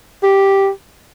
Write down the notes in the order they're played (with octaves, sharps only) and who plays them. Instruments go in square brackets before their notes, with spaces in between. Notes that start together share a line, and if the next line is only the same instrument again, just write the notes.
[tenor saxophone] G4